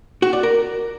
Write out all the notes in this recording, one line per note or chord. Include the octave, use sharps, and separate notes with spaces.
F#4
D5
A#4